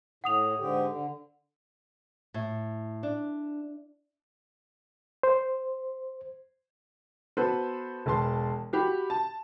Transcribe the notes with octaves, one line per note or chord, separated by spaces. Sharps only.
A2 F#5 D#6 F7
G#2 D3 G4
D3
A2
D4
C5
B3 F#4 A4 B4 C5
E1 B4 A5 C6
F#4 G4 B5
A5